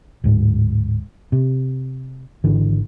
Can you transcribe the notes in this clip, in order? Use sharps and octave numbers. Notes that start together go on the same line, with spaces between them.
D1 G#2
C3
G#1 D3 E3